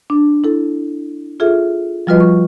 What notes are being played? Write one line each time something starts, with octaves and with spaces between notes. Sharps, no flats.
D4
E4 A4
F4 G#4 A4 E5
F3 G3 F4 F#4 B4 D#5
C#6